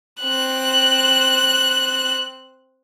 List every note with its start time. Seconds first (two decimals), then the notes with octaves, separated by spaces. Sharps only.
0.23 C4 F#6